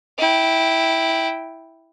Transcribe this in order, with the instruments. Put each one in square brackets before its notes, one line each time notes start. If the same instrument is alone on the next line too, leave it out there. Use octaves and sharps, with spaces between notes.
[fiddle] E4 G5